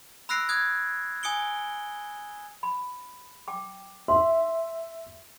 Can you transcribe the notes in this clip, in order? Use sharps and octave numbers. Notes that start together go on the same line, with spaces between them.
B5 E6 F#6 A#6 C7 D7
D#6 F#6 G#6
G#5 D#6 C#7 D7 G7
B5
G5 D6
E5 C6